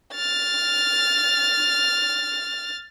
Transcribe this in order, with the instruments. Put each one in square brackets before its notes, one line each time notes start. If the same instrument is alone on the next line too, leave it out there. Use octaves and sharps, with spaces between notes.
[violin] F6 A6